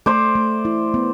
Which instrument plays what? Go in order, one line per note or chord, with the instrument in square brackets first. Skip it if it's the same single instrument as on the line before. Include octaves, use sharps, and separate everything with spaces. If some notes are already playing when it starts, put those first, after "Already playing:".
[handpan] A3 [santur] C5 D5
[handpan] A3
E4
B3